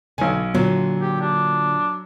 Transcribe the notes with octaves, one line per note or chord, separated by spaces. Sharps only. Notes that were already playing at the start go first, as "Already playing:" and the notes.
B1 D3 G#5
A#2 D3 F#3
G4
D4